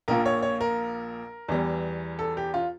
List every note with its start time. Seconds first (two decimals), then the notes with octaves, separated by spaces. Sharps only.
0.08 A#1 A#2 F3 A#3 A#4
0.26 C#5
0.42 C#5
0.61 A#4
1.48 E2 E3 G3
2.19 A4
2.37 G4
2.54 F4